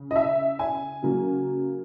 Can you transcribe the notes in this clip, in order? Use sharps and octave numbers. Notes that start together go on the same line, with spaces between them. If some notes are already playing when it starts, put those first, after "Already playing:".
Already playing: C#3
D#5
E5
G#5
C#3 F#3 A#3